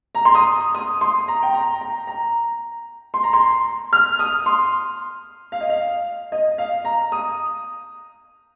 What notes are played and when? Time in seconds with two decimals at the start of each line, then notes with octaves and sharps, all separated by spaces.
0.15 A#5
0.25 C6
0.35 D#6
0.75 D#6
1.01 C6
1.28 A#5
1.43 G5
1.54 A#5
1.81 A#5
2.07 A#5
3.14 C6
3.23 A#5
3.33 C6
3.93 F6
4.19 D#6
4.46 C6
5.52 F5
5.61 D#5
5.70 F5
6.32 D#5
6.58 F5
6.85 A#5
7.12 D#6